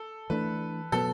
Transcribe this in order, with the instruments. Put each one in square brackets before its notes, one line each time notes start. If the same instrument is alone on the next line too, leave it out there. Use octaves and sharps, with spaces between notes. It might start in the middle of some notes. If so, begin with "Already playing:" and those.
Already playing: [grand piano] A4
[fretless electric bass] E3 A3 D4 [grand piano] B4
[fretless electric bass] B2 F#3 B3 [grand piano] A4